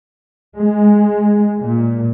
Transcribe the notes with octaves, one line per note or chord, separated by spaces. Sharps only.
G#3
A#2